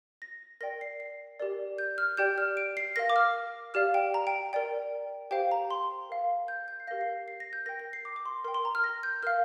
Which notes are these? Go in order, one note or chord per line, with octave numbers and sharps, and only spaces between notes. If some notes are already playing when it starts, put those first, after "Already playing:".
A#6
A#4 D5 G5 A#6
C7
C7
G4 A#4 D5
G6
F6
G4 D5 G5 G6
F6
D7
C7
A#4 F5 A#6
D6
F6
G4 D5 F5 F6
G5
A#5
G5
A#4 D5 G5
G4 C5 F5 G5
A#5
C6
A#4 F5
G6
G6
C7
G4 A#4 F5 A#6
C7
C7
A#6
G6
A#4 G5 A#6
A#6
C7
D6
D6
C6
A#4 G5 C6
C6
A#5
F6
A#6
G6
A#4 F5 F6